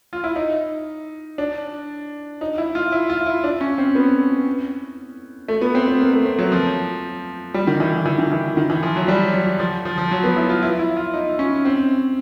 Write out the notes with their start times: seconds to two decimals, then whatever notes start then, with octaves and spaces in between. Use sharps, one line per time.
0.13 F4
0.24 E4
0.36 D#4
1.38 D4
2.41 D#4
2.58 E4
2.75 F4
2.92 E4
3.10 F4
3.26 E4
3.44 D4
3.61 C#4
3.78 C4
3.95 B3
5.48 A3
5.62 B3
5.75 C4
5.88 B3
6.01 A#3
6.13 A3
6.26 C4
6.39 F#3
6.52 F3
7.54 G3
7.67 D#3
7.80 E3
7.93 E3
8.06 E3
8.18 D#3
8.32 E3
8.57 D#3
8.70 E3
8.83 F3
8.96 F#3
9.08 G3
9.34 F#3
9.60 F3
9.85 F3
9.98 F3
10.11 F#3
10.24 B3
10.36 E4
10.50 F4
10.63 E4
10.79 E4
10.96 F4
11.14 D#4
11.39 C#4
11.65 C4